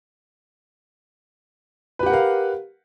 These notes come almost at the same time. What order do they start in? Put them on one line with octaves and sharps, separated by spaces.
B4 G4 F#5 A#4 F5